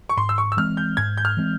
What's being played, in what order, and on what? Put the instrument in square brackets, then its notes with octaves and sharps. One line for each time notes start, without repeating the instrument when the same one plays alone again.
[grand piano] C#6
[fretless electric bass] G#2 [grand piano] C6
[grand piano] E6
C#6
E6
[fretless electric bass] E3 G#3 C4 [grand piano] F6
[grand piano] G6
[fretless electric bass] G#2 [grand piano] G#6
[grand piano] G6
F6
[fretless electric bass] E3 G#3 C4